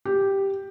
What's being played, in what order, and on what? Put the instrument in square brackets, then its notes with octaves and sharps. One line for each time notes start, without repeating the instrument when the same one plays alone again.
[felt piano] G4